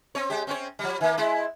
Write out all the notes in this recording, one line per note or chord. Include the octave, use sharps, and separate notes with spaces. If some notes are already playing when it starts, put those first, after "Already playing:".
C4 C#5
G#3 G4
C4 C#4 C#5
F3 G3
D#3 A#3
G#3 E4